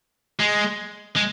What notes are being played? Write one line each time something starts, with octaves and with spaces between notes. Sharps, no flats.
G#3
G#3